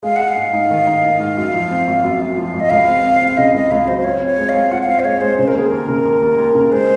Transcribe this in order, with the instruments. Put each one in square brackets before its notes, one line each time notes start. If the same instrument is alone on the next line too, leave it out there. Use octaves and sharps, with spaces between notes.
[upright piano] G#3 [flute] F5
[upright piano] G#3 [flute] F#5
[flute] F5
[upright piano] G#2
D#4
D#3
D#4
D#4
G#2
F#2
F3
C4
G#1
F#2
F#2
F3
G#1
[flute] D#5
[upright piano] C#2 [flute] F5
[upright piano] C4
C4
C4
[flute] F5
[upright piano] C#3 [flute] D#5
[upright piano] C#2 [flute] D#5
[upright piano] C#2 [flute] F5
[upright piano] F#3 [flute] C5
[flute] C5
[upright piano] F4 [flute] C#5
[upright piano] C4 [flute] C#5
[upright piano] G#3
[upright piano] C4 [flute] F5
[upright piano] F4 [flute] F#5
[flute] F#5
[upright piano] C4 [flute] F5
[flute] C5
[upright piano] G#3 [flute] C#5
[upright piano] G#3 [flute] C5
[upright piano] C#3 [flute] C5
[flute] A#4
[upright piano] D#2 [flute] G#4
[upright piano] D#2 [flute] A#4
[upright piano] C#3
D#2
D#2
D#2
C#3
[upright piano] G#3 [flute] C5